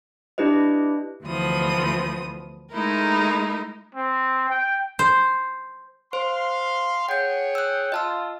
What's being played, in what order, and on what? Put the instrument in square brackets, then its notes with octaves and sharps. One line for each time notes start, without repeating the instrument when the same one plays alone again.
[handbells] D4 E4 G4 B4 D#5
[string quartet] D2 E3 F3 B3 D#6
G#3 A3 D#4 E4 A#4
[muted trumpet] C4
G5
[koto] C5
[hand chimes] C5 [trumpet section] F5 C6
[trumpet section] G#4 C#5 G5 [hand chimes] F#5 G6
[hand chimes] E6 F#6
[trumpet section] F4 [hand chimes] D#5 A5 E6